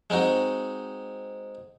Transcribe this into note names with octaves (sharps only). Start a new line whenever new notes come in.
G#3 C4 D#4 F#4